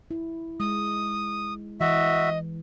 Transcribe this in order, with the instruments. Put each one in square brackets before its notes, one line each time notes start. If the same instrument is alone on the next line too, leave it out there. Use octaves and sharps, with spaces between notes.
[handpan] E4
[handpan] G#3 [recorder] D#6
[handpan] E3 [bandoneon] F#4 E5 [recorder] D#5